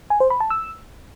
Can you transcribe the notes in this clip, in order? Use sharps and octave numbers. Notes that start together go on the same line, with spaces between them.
G#5
C5
B5
A5
E6